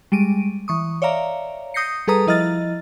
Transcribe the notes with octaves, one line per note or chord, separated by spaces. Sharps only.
G3 G#3 D7 D#7
E3 C#6 D#6
C#5 D5 E5 F5 A#5
D#6 G6 A#6 C7 C#7
G3 G#4 A4 B4 A#5 D#6
F3 E4 D#5 A#5 F6 A6